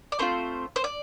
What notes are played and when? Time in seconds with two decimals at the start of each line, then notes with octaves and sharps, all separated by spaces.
0.12 D5
0.19 A3 C4 F4 C5
0.76 C5
0.84 D5